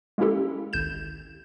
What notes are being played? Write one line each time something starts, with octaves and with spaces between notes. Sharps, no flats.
G#3 A#3 C#4 E4 G4 A4
G#1 C#2 G6 E7